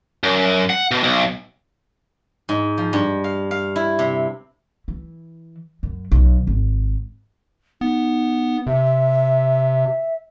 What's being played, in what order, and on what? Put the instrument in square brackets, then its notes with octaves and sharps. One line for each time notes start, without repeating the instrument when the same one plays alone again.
[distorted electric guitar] F#2
F#5
B2
B1
[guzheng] G#2
F3
G2
F5
F5
E4
C3
[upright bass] E3
F#2
B1
G#1
[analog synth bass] B3 [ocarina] D#4
[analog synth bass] C3 [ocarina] E5